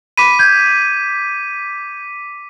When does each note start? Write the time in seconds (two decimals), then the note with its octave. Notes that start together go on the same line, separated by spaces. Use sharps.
0.18 B5 D6 B6 D#7
0.39 G6 G#6